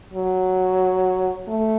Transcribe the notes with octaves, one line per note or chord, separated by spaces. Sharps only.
F#3
A3